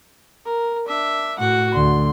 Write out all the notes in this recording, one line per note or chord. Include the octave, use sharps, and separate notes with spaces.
A#4
D4 E5
A2 F#4 F#5
D2 D3 C6